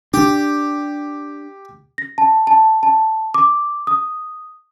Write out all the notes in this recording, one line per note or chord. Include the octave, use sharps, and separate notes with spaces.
D4 G4
A#6
A5
A5
A5
D6
D#6